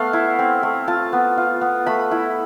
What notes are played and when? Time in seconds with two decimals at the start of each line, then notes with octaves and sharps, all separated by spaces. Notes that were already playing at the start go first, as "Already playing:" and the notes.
Already playing: A3 B3 F5
0.13 E4
0.39 C4
0.63 A3
0.88 F4 A5
1.13 B3
1.37 F4
1.61 B3
1.86 A3 B5
2.11 E4